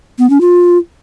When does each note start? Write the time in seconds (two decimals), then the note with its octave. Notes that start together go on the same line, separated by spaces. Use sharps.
0.19 B3
0.30 C#4
0.41 F4